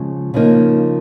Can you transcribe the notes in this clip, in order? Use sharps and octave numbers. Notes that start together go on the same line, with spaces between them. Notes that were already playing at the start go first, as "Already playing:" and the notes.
Already playing: C#3 F3 G#3
C#3 F3 A#3 D#4